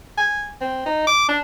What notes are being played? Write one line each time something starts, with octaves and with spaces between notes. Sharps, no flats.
G#5
C4
D#4
D6
D4